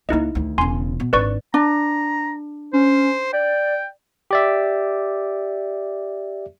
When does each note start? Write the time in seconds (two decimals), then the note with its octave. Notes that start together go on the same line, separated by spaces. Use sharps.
0.09 C#2 A#3 D#4 E4 D#5
0.35 D2 D#3
0.58 E1 C#3 G#5 C6
1.00 B2
1.13 G#1 D4 B4 D5 C#6
1.54 D4 A#5
2.73 C#4 C5
3.33 D5 G5
4.31 G4 D5 E5